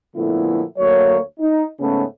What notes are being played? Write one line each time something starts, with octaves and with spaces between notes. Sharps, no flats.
A#2 D3 F3 A3 B3 E4
D2 F#3 A#3 C#5
D#4
G#2 C#3 A3 B3 C#4